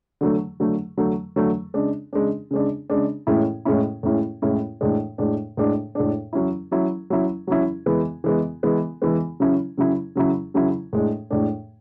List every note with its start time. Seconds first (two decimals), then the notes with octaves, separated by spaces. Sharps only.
0.21 D3 F#3 A3
0.60 D3 F#3 A3
0.97 D3 F#3 A3
1.36 D3 F#3 A3
1.74 C#3 G#3 D4
2.13 C#3 G#3 D4
2.51 C#3 G#3 D4
2.90 C#3 G#3 D4
3.27 A2 G#3 C#4 E4
3.65 A2 G#3 C#4 E4
4.03 A2 G#3 C#4 E4
4.42 A2 G#3 C#4 E4
4.81 A2 G#3 D4
5.18 A2 G#3 D4
5.57 A2 G#3 D4
5.95 A2 G#3 D4
6.33 F#3 C#4 E4
6.71 F#3 C#4 E4
7.10 F#3 C#4 E4
7.47 F#3 C#4 E4
7.86 E3 G#3 B3
8.24 E3 G#3 B3
8.63 E3 G#3 B3
9.02 E3 G#3 B3
9.40 C#3 F#3 C#4 E4
9.78 C#3 F#3 C#4 E4
10.16 C#3 F#3 C#4 E4
10.54 C#3 F#3 C#4 E4
10.93 A2 G#3 D4
11.31 A2 G#3 D4